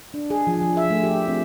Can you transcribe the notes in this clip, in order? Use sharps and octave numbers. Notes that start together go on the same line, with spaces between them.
D4
G#4
F3
F3
E5
A3
G4
C4